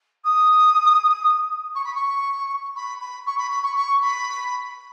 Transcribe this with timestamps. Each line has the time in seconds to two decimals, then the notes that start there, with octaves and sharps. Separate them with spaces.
0.24 D#6
1.75 C#6
1.84 B5
1.95 C#6
2.76 B5
3.01 B5
3.26 C#6
3.38 B5
3.51 B5
3.63 C#6
3.76 C#6
4.01 B5